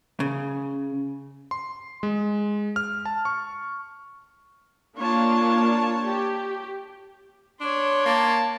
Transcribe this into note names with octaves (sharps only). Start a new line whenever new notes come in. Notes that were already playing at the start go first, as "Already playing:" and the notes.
C#3
C6
G#3
F6
A5
C#6
A#3 D4 F4 C#5 A5
G4
D4 C#5 C6
A#3 A5